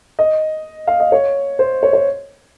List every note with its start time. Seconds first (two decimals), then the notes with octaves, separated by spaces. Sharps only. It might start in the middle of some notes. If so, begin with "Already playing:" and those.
0.19 D#5
0.87 F5
1.00 D#5
1.12 C#5
1.59 C5
1.83 C#5
1.93 C#5